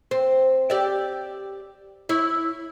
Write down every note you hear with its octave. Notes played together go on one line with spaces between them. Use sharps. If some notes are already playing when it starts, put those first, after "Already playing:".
C4
G4 D5 E5
E4 C#5